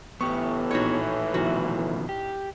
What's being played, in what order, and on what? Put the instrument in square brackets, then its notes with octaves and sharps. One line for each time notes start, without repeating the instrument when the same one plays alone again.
[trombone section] A2 E3 [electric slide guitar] B3 G4 [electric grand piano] C#6
[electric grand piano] A#1 D#4 E4 [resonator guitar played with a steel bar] F#4 C#5
[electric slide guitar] B2 D#3 F3 [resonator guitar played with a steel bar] F#4
[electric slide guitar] G4